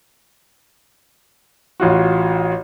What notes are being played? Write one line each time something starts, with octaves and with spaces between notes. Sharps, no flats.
A1 F4 F#4